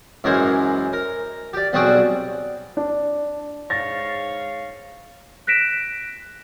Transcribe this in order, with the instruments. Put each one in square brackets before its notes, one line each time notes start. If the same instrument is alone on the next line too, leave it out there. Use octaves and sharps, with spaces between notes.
[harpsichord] F#2 E3 G#3 A#4 C5 G#5
A#4
G4 D5
B1 G3 C4 F#4 G#4 D6
[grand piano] D4
[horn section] G#2 C#5 F5 [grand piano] A6 A#6
[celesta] F#6 A#6 B6 D7 E7